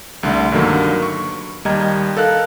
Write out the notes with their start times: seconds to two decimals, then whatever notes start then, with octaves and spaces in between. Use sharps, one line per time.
0.23 C2 D3 A3
0.52 G2 D3 D#3 F#3 A#3
1.03 C#6
1.65 D#2 G3 D#5 A#5 G#6
2.17 A4 A#4 F5 F#6